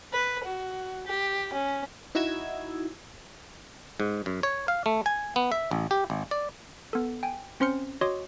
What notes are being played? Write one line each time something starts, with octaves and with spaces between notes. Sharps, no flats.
B4
F#4
G4
C#4
D#4 E4 F#4 D#5 E6 G#6
G#2
F#2
C#5
F5
A3
G#5
B3
E5
A1
G4
G#1
D5
B3 A4
G5 G#5
C4 C#4 C5 C6 F6 C#7
F#4 C#5 D#5 C6 D6 D#6